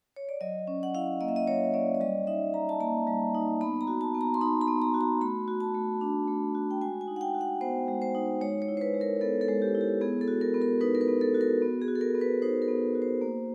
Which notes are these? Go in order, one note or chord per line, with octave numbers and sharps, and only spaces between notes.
C#5
D5
F#3 D#5
C#4
F#5
E4 F5
A#3 D#5
E5
D#5
F#3 C#5
C#4 D5
D5
G3 D#5
D#4 E5
G3 A#5
A5
A#3 A#5
G3
D#4
B3 B5
A#5
F#4
A5
B3
A#5
C6
D#4 B5
B5
B3
A#5
F#4
A#5
A3 B5
F#4
A5
A3
D4
A3
F#4
G5
G#3 G#5
G#5
D#4
F#5
G5
F#4
F#5
B3 C5
G#3
C5
D#4
G#3 C#5
C#5
E4
C5
B4
G#3
A#4
B3 A4
A4
G#3
G4
E4
G4
B3 G#4
A4
F#4
A#4
B3
A#4
D#4 B4
A#4
B4
B3
A4
F#4
A#4
B3
G#4
F#4
A4
A#4
B3
B4
D#4 C5
A#4
B3
F#4
C5
A#3